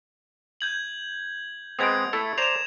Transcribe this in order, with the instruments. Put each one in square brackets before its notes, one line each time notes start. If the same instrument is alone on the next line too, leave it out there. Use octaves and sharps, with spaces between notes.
[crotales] G6 G#6 F#7
[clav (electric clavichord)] G#3 B3 C4 [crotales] D#6 G#6 D7
[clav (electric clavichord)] A3 E4 A4
[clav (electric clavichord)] C5 D5 A#5 [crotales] E7 F7